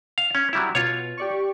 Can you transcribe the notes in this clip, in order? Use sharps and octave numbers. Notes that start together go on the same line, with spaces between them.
F5
C#4
F#3 G3 E4
B2 F4 C#5
G4 D5 C#6